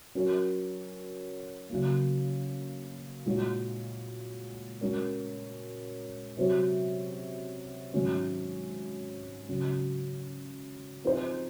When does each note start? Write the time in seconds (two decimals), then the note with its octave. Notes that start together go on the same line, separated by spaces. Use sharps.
0.15 F#3 C#4 F#4 A#4 C#5
1.70 C#3 F#3 A#3
3.26 A#2 G#3 D#4 F#4 C#5
4.81 G#3 C#4 F#4 A#4 C#5
6.37 C3 F#3 C4 F#4 C#5
7.93 G#2 D#3 F#3 C#4 F#4
9.48 C#3 F#3 C#4 F#4
11.04 F3 C4 D#4 G#4 C5